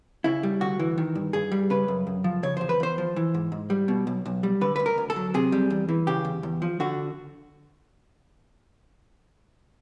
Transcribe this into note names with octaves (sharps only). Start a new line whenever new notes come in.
C#3 E4
G3
D2 F#4
E3
D#3
G2
G2 G#4
G3
C#3 B4
F#2
F#2
F3
C#3 C#5
E2 C5
B4
E2 C5
F3
E3
G#2
G#2
G3
B2
B1
B1
G3
D3 B4
D2 B4
A#4
D2
A4
F#3
C3 G#4
G3
E2
E3
C#3 G4
E2
E2
F3
D3 F#4